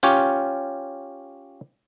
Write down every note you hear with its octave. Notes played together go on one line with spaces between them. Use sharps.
C#4 F4 G4 C#5